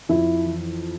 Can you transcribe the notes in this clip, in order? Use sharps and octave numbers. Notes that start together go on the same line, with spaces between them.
F2 E4
E3